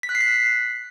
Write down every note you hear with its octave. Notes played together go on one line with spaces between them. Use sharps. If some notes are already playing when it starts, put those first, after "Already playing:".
B6
F#6
C7
B6